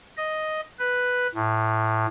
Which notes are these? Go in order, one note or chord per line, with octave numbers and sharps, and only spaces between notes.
D#5
B4
A2